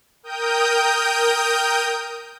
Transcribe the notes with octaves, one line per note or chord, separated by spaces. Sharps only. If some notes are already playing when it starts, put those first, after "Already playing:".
A#4 G5 D#6 G6